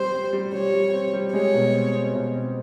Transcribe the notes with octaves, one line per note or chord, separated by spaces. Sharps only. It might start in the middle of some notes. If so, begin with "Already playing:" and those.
Already playing: G3 C4 C5
G3
G3
G3 C#5
G3
C4
G3
G#3 C#5
B2
C4
C4
B2
C4